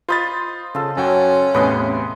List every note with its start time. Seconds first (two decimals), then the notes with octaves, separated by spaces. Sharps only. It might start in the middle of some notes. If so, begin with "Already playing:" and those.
0.09 F4 C5 D#5 B5 A6
0.75 C#3 F4 A4
0.97 F#2 C#4 F#4 G5
1.54 E2 A2 C3 B4 D#5 C6